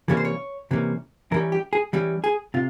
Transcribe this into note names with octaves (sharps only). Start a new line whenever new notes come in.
C3 E3 G3 A#3 C#4 C#5
C5
C#5
C3 E3 G3 A#3 C#4
E3 G3 C#4 A#4
G4
G#4
E3 G3 C#4
G#4
C3 F4